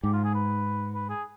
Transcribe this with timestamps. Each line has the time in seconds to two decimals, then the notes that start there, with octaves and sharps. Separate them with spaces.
0.03 G#2 G4
0.13 F4
0.24 G#4
0.34 B4
0.95 B4
1.09 G#4